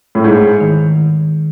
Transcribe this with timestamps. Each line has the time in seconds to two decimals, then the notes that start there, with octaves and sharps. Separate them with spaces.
0.15 A2
0.24 G#2 G#3
0.60 D#3